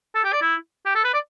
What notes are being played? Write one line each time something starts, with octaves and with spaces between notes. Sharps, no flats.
A4
G4
D5
E4
G4
A4
B4
D5